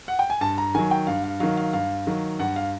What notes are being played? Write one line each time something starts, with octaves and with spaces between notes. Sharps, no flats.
F#5
G5
G#5
G2 A5
A#5
D#3 F#3 G#5
G5
G2 F5
F5
D#3 F#3 F5
F5
G2 F5
D#3 F#3
G2 F#5
F5